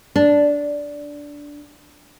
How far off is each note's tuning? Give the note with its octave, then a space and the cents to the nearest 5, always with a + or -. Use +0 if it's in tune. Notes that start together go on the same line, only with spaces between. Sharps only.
D4 -10